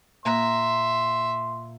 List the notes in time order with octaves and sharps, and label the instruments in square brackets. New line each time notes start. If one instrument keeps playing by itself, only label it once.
[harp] A#2 A#5 F#6 [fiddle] E5 [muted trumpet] C6